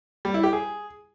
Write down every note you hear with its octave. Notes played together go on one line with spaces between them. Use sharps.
G3
E4
G4
G#4